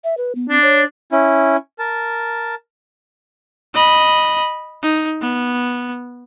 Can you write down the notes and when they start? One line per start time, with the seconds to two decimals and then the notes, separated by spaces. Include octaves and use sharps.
0.04 E5
0.17 B4
0.35 B3
0.49 C4 D4
0.62 C#5
1.12 C#4 E4
1.79 A#4 A5
3.74 D#5 B5
4.83 D#4
5.21 B3